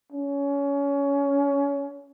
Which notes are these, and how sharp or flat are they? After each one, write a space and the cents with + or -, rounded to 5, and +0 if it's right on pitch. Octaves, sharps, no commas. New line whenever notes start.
C#4 +25